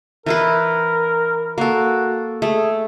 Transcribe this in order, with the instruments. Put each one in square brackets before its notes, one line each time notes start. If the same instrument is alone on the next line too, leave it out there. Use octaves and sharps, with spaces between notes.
[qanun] E3 E4 B4 [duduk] A#4
[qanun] A#3 A4 [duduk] F#4
[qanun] A3 [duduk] G#4